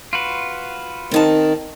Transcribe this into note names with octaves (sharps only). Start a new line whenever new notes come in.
F4 F#4 B4
D#3 C4 D#4 A5